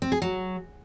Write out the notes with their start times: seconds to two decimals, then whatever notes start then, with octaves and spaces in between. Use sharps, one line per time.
0.02 C4
0.12 G#4
0.22 F#3